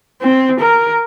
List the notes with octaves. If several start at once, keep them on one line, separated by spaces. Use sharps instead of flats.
C4
A#4